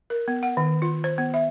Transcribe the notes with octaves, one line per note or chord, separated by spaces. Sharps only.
A#4
B3
F#5
D#3
F4
C5
B3
E5